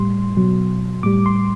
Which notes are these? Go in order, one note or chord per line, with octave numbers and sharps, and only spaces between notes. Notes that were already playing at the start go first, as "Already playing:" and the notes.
Already playing: A2 G3 C6
B2 F#3
A2 G3 D6
C6